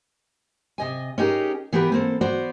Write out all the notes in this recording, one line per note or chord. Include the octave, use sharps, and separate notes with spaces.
C3 D#5 G#5
C#4 D#4 G4 G#4 A#4
E3 B3 G4 A#4 B4
A#3 C4 A4
B3 F#4 C5 D5